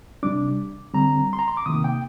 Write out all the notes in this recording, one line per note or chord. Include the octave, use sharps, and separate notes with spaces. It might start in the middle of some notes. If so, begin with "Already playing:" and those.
C3 G3 D4 D6
D3 G3 C4 A#5
C6
A#5
C6
D6
C3 D#3 A#3 D#6
G5